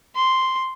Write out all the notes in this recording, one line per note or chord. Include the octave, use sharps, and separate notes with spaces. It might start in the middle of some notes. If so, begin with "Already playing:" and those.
C6